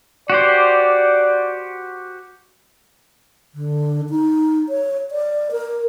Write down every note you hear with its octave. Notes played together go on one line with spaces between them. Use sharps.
F#4 G4 C5 D5
D3
D#4
C#5
D5
A#4